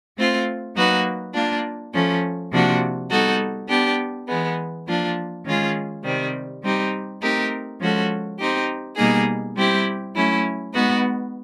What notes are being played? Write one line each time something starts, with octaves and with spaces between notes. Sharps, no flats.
A3 C4 F4
F#3 A#3 D#4 F#4 B4
A#3 D4 F4
F3 A3 C#4
C3 F3 A#3 D4 F#4
G3 B3 D#4 F#4 A4
B3 D4 G4
E3 G#3 B3
F3 A#3 D4 F4
D#3 G#3 C#4 F4 G#4
C3 D#3 G3 C4
G3 C4 D#4 G4
A3 C4 D#4 G4 A#4
F3 G#3 C#4 F#4 A4
C4 D#4 G4
B2 G3 A#3 D#4 G#4
G3 C4 E4 G4
F#3 A3 C#4 E4
G#3 B3 D#4 F#4 B4